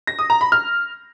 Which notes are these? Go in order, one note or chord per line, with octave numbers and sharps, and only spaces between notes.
A#6
D#6
A#5
B5
F6